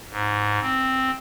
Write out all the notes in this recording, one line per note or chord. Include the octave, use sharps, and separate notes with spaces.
G#2
C4